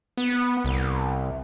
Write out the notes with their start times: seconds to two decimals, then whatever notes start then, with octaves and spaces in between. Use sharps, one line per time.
0.18 B3
0.65 C2